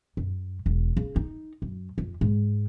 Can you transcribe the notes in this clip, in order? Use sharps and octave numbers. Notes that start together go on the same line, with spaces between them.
F#2
E1
C#3
D#4
F#2
F2
G#2